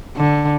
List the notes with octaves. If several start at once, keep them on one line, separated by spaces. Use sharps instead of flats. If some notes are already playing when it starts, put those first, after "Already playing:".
D3